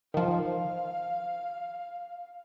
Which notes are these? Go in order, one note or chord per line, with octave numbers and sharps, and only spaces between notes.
D#3 F3 F5